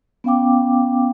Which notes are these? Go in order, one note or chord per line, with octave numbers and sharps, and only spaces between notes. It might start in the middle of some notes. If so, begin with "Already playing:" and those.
B3 C#4 F5 G5 D6